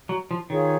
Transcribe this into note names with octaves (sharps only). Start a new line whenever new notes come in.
F#3
F3
D#3 F4 G#4 C#5